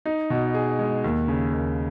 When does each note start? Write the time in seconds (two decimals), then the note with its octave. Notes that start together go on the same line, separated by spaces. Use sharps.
0.06 D#4
0.30 B2
0.54 G#4
0.79 G#3
1.04 D#2
1.28 C#3
1.53 D#2